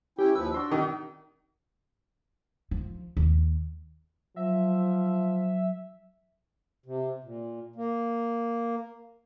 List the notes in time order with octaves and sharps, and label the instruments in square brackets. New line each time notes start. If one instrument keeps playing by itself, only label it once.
[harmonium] C#4 E4 G5 [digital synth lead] G4
[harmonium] D#2 F3 B4 [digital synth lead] E6
[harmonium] D4 [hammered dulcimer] F#4 C6
[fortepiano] D#3 [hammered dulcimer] F#4 E5
[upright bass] F3
D#2
[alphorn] F3 [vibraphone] F#3 [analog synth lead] E5
[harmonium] C3
A#2
A#3